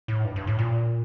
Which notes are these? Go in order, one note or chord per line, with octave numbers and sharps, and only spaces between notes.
A2
G2
G2
A2
A#2